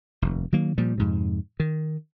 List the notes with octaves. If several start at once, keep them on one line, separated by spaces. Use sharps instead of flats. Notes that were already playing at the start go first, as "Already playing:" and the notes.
F1 D#2
D#3 F#3 A#3
A#2 F3 G3
F2 G#2 C3
D#3